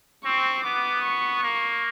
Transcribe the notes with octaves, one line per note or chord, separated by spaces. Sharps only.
C4 C#6
B3 D6
C#6
A#3